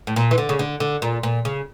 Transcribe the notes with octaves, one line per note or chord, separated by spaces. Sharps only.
A2
A#2
E3
D3
C#3
D3
D3
A#2
A#2
C#3